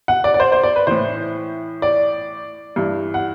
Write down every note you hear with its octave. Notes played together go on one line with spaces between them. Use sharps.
F#5
D5
D5
C5
C5
D5
B4
A2 E3 C5
D5
G2 E3
F#5